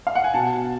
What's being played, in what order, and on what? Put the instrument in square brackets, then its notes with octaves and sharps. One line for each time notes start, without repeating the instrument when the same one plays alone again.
[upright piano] F5
F#5
G#5
B2 A5